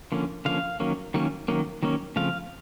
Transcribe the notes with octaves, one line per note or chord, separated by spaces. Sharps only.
D3 F3 A#3 C#4
D3 F3 A#3 C#4 F5
D#3 F#3 A#3 C#4
D#3 F#3 A#3 C#4
D#3 F#3 A#3 C#4
D#3 F#3 A#3 C#4
C#3 F3 A3 C4 F5